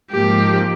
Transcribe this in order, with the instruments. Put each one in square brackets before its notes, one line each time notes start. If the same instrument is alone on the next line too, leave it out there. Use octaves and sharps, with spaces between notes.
[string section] G#2 F3 A#3 [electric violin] G4